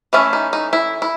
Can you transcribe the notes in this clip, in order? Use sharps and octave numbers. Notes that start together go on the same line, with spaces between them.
E3 A3 C#4 E4
D#4
D#4
E4
E4